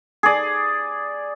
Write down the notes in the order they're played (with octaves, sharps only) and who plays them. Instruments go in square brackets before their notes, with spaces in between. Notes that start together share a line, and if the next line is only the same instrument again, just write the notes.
[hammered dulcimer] G#4 D5